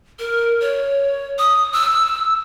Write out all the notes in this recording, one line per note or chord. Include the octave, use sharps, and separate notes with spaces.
A#4
C#5
D#6
E6